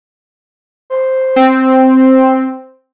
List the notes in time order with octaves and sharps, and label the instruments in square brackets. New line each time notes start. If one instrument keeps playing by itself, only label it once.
[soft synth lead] C5
[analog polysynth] C4